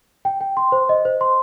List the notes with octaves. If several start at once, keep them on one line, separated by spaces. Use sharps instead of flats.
G5
G5
C6
C5
D#5
C5
C6